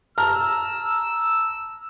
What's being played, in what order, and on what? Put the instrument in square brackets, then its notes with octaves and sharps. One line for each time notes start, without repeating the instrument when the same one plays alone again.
[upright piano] A5 A#5 F6 [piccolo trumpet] E6